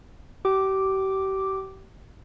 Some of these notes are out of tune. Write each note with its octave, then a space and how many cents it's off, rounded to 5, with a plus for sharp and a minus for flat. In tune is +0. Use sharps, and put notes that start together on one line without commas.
G4 -35 D6 +0